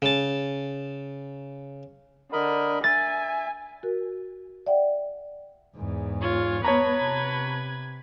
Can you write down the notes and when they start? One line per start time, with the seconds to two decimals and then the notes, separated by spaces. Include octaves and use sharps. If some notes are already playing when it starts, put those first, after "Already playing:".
0.02 C#3 A5
2.32 D3 A#4 D#5 B5
2.84 E5 G#5 A6
3.83 F#4 A#4
4.66 D5 E5 F#5 G5
5.77 E2 G#2
6.22 F4 C#5
6.65 B3 B4 C#5 A5 A#5 G#6
7.00 C3